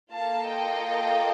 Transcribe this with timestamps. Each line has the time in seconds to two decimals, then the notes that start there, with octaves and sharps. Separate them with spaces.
0.12 A#3 F4 A4 F5 A5
0.48 D#5 G5